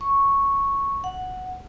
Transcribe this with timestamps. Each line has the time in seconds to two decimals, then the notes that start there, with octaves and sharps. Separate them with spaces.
0.01 C#6
1.04 F#5